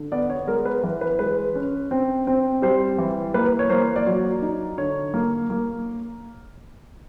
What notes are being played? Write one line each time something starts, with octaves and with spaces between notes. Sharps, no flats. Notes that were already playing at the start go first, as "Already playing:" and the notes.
Already playing: D3
B3 D5
C#5
G#3 A#4
B4
E3
B4
G#3 B4
C#4
C4
C4
G3 C5
E3
A#3 B4
C#5
A#3 C5
D5
F#3 C#5
D#4
D3 C#5
A#3
A#3